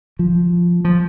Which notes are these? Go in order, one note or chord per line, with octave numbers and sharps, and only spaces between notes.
F3
F3